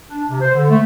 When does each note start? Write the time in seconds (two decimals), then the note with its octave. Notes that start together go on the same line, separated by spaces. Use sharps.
0.10 D4
0.29 C3
0.41 C5
0.55 D3
0.70 A3